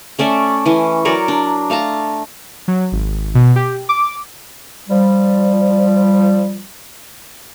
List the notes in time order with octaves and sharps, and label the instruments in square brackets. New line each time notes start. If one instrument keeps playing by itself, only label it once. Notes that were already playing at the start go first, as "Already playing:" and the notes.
[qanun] A3 C#4 D5 E5
E3 C#4
F#3 A#4 C#5 D5
D4
A3 F5 A5 A#5
[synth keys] F#3
G#1
B2
G4
D6
[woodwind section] F3 G3